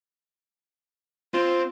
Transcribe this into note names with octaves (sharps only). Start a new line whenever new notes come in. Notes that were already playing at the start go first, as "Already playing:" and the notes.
C4 F4